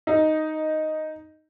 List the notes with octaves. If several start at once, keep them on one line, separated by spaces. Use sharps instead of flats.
D#4